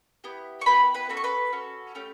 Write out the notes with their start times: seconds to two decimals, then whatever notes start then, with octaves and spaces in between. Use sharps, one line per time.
0.24 B3 E4 G4
0.61 C#6
0.66 B3 E4 G4 B4 B5
0.94 B4 B5
1.09 C#4 F#4 A4 B5
1.17 C#6
1.24 B4 B5
1.52 C#4 F#4 A4
1.95 A3 C#4 G4